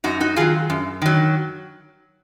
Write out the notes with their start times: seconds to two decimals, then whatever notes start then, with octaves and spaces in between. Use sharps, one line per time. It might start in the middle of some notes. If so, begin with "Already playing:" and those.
0.04 F#2 D#4 F#4
0.20 D#4 F#4
0.36 D#3 F#3 F4 G#4
0.70 F#2
1.02 D#3 F#3